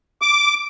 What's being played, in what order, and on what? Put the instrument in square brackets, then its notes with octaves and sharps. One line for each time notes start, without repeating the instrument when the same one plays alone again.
[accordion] D6